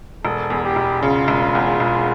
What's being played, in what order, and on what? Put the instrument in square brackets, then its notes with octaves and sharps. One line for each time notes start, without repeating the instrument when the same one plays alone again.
[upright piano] E1 [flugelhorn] A4
[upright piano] E2
[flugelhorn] G4
[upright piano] E1
[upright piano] C#3 [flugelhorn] F4
[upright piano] E1
E2
E1